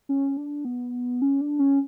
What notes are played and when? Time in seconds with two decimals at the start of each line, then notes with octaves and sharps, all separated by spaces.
0.09 C#4
0.37 D4
0.65 B3
1.22 C#4
1.41 D4
1.59 C#4